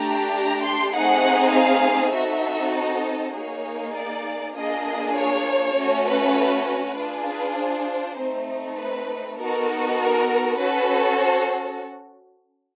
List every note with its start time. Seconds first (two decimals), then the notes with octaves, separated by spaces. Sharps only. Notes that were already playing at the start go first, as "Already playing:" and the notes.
Already playing: A3 D4 G4 A#5
0.33 A#5
0.64 C6
0.93 A3 C4 D#4 G#4 F#5
1.54 F5
2.13 C4 D#4 F#4 A4 E5
2.75 D#5
3.35 A#3 D#4 G#4 C#5
3.94 D5
4.55 A#3 D4 F4 G#4 D#5
5.15 C#5
5.75 A3 C#4 F#4
6.05 B4
6.66 B4
6.96 D4 F4 G#4
7.26 B4
7.56 C5
8.17 A3 C4 D#4
8.77 B4
9.38 B3 D#4 F#4 A4 A#4
9.98 A#4
10.58 C#4 F#4 A4 B4
11.18 C5